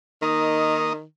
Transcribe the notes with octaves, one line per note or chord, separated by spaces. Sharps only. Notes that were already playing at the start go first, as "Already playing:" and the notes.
D#3 A#3 D#4 D#5